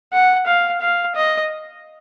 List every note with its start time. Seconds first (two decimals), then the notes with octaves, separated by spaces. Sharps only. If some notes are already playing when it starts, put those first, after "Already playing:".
0.13 F#5
0.47 F5
0.81 F5
1.15 D#5